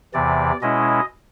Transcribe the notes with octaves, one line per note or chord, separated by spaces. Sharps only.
E2 C3 E3 D5
B2 G#3 C#4 E4 D#5